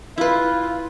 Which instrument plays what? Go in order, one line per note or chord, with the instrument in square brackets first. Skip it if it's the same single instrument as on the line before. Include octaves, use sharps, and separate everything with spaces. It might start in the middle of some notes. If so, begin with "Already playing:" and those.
[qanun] E4 B4 [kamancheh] F4